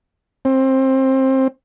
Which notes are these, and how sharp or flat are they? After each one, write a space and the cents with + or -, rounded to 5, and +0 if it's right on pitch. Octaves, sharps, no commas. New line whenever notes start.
C4 +20